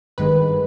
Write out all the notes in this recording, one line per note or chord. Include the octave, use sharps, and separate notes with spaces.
G#1 G2 D#3 G#3 B4